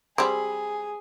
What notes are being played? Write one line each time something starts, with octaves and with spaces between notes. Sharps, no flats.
G3 C4 G#4 B5